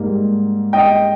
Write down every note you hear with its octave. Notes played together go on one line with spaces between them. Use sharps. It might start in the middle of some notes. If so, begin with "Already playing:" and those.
Already playing: G#2 G3 A#3
D#5 G5